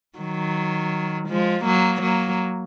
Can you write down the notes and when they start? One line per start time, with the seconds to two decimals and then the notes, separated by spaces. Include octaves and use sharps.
0.19 D#3 F#3
1.29 F3 G#3
1.65 F#3 A#3
2.02 F#3 A#3